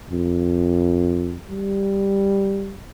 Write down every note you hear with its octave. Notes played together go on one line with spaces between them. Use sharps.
F2
G3